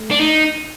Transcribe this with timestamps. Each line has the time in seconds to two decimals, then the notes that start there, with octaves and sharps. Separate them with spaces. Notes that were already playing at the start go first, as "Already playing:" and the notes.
Already playing: A3
0.11 D4
0.20 D#4